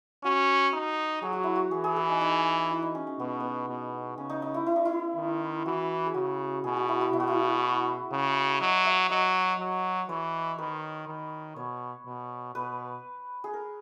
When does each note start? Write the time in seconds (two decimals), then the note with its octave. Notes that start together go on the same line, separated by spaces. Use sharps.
0.24 C#4 F#4
0.73 D#4
1.22 F#3 G#4
1.33 F#4
1.43 E4
1.56 F#4
1.71 E3 G#4
1.84 G#4
1.96 G#4
2.08 D#4
2.21 D#4
2.70 E4
2.82 D#4
2.95 C#4
3.07 C#4
3.19 B2 B3
3.40 B3
3.68 B2
4.18 C#3 C#4
4.30 D#4
4.42 D#4
4.54 E4
4.66 E4
4.76 D#4
4.85 E4
5.16 D#3
5.65 E3 F#4
6.07 G#4
6.14 C#3 F#4
6.64 B2 G#4
6.77 F#4
6.89 E4
7.01 F#4
7.13 B2 E4
7.20 F#4
7.27 E4
8.12 C#3
8.61 F#3 D#5
8.85 E5
9.10 F#3 D#5
9.59 F#3
10.08 E3 C#5
10.58 D#3 B4
11.07 D#3
11.56 B2 C#5
12.06 B2
12.55 B2 B4
13.44 G#4
13.53 A#4